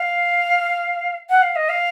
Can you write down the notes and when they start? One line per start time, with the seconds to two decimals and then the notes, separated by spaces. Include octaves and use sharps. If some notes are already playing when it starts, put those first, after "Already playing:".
Already playing: F5
1.30 F#5
1.42 F5
1.56 D#5
1.69 F5